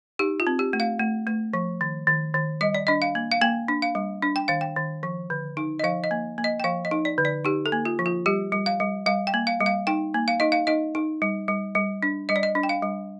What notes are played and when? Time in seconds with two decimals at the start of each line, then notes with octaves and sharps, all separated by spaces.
0.19 D#4 G4
0.40 F4
0.47 C4
0.59 G4
0.73 A3
0.80 F5
0.99 A3
1.27 A3
1.53 F3
1.81 D#3
2.07 D#3
2.34 D#3
2.61 G3 D#5
2.74 D5
2.87 D4 D#5
3.02 F5
3.15 A#3
3.31 F5
3.41 A#3 G5
3.68 D4
3.82 F5
3.95 G3
4.22 D4
4.36 G5
4.48 D#3 F5
4.61 G5
4.76 D#3
5.03 F3
5.30 D3
5.57 D#4
5.79 D#5
5.84 F3 F5
6.04 D#5
6.11 A#3
6.38 A#3
6.44 D#5
6.60 G5
6.64 F3 F5
6.85 D#5
6.91 D#4
7.05 D5
7.18 D3
7.25 D5
7.45 D#4 G4
7.66 A4
7.72 A#3
7.85 F4
7.99 F3
8.06 F4
8.26 G3 G4
8.52 G3
8.66 F5
8.80 G3
9.06 G3 F5
9.27 G5
9.34 A#3
9.47 F5
9.60 G3
9.66 F5
9.87 D#4 G5
10.14 A#3
10.28 F5
10.40 D#4 D#5
10.52 F5
10.67 D#4 D#5
10.95 D#4
11.22 G3
11.48 G3
11.75 G3
12.03 D4
12.29 G3 D#5
12.36 D5
12.43 D#5
12.55 D4
12.63 G5
12.69 F5
12.82 G3